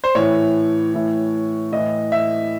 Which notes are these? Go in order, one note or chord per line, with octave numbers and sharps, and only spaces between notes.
C5
A2 E3 C#5
A2 E3
A2 E3 D#5
E5